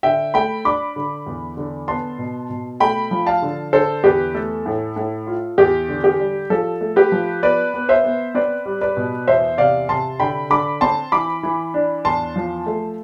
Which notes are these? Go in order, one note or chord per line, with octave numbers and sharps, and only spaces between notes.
D3 E5 G5
A3 G5 B5
D4 B5 D6
D3
E2
D3
B3 A5 C6
B2
B2
A3 G5 B5
F3
F5 A5
D3
D3 A4 C5
E2 G4 B4
A3 A4
A2
A2
F4
E2 G4
D3
G4
G3
F3 A4
A3
G4 B4
F3
B3 B4 D5
B3
C5 E5
B3
C4 B4 D5
G3
B4 D5
B2
E2 C5 E5
C3 D5 F5
C3 A5 C6
D3 G5 B5
D3 B5 D6
C4 A5 C6
E3 B5 D6
E3
D4
E2 A5 C6
F3
A3